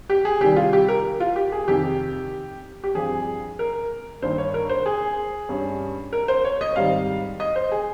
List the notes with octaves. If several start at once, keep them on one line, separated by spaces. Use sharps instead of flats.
G4
G#4
C3 D#3 G3 G4
F4
G4
A#4
F4
G4
G#4
F2 C3 D#3 G4
G4
G2 F3 C4 G#4
A#4
G2 D#3 A#3 C5
C#5
A#4
C5
G#4
G2 G3 C#4
A#4
C5
C#5
D#5
G#2 D#3 G3 C4 F5
D#5
C5
G#4